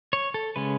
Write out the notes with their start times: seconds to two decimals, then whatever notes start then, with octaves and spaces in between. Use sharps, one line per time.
0.13 C#5
0.34 A4
0.56 C#3 G#3 C#4 B4